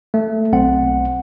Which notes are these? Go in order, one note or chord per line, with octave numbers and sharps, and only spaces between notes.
A3
B1 C4 F#5